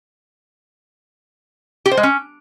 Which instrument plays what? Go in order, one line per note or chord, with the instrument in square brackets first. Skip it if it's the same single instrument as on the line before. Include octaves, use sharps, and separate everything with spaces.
[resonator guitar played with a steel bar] G4
C5
G#3
C#4